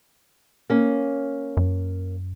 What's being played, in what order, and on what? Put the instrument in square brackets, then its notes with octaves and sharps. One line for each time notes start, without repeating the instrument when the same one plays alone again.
[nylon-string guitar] A#3 C#4
[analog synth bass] F#2